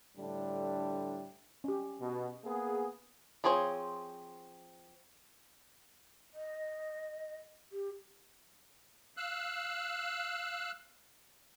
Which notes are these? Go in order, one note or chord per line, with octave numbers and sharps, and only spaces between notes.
A2 D3 G3 D4
C#4 G4
B2
A#3 B3 G#4
F3 C4 G#4 C5 C#5
D#5
G4
F5 E6 F#6